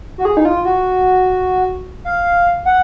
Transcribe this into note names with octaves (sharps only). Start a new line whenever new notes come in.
F#4
G#4
D#4
F4
F#4
F5
F#5